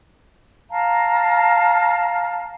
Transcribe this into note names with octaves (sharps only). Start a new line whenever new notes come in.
F5 A5 A#5